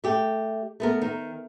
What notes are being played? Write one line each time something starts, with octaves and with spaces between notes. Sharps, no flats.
A3 G4
A3 B3 A#4
D#3